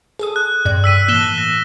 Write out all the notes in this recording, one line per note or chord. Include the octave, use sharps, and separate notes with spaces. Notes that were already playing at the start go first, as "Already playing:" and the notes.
G#4 A4 D#6
F#6
G2 C3 D5
E6 B6 D#7
A2 E3 A#3 F#6 E7 G7
A#6